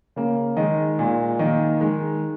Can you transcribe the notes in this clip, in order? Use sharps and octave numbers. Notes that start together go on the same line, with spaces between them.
C#3 A#3
D#3 G#3 D#5
A#2 G#3
D#3 A#3 D#5
D#3 G#3